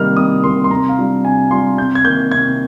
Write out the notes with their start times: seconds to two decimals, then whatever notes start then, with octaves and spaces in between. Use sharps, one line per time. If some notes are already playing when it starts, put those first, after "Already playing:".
Already playing: C3 D#3 G3 A#3 F6
0.16 C3 D#6
0.44 D#3 G3 A#3 C6
0.64 C6
0.71 C3 A#5
0.89 F5
0.98 G3 D4 F4
1.24 C3 G#5
1.51 G3 D4 F4 C6
1.77 C3 G6
1.95 G#6
2.05 D#3 A#3 G6
2.31 C3 G#6